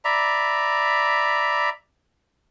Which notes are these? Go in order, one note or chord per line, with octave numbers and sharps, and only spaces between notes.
D5 E5 A#5 B5